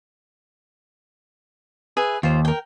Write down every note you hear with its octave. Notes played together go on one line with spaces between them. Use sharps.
G#4 B4 E5
D#2 F4 C5
A#4 G5